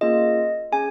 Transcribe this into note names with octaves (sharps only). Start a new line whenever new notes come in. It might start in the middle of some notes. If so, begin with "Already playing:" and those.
A#3 C#4 F4 G#4 D#5
C#4 G#4 G#5